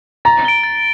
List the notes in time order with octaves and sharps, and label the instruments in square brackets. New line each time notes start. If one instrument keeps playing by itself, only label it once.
[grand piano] A#5 [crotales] A6
[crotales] D7 G7
A6